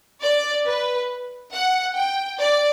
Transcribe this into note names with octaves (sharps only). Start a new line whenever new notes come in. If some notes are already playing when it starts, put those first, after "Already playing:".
D5
B4
F#5
G5
D5